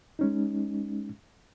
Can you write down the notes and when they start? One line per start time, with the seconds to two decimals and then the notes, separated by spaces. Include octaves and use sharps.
0.19 G#3 C#4 D#4